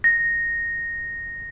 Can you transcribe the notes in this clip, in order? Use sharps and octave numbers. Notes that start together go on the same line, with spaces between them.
A#6